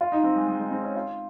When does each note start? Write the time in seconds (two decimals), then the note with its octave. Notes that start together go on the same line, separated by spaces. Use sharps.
0.01 F4
0.12 D#4
0.24 C4
0.36 G#3
0.47 G#3
0.59 G#3
0.71 C4
0.83 C#4
0.96 F4